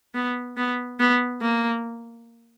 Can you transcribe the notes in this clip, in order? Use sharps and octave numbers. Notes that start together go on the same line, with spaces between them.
B3
B3
B3
A#3